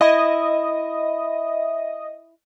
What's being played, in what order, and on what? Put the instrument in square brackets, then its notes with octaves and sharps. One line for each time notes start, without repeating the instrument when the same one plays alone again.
[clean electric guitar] E4 [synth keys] D#5